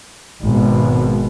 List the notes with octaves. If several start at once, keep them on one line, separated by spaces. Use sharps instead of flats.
G#1 B2